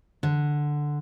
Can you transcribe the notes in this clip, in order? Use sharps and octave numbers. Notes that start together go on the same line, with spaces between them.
D3